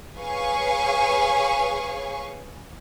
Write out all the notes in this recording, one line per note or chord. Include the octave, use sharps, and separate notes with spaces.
G#4 B4 C#5 F5 G#5 C#6